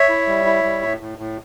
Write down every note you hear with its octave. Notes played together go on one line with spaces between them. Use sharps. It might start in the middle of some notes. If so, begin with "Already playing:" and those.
Already playing: C#5 E5
E4
G3
E4
G3
A2
A2
A2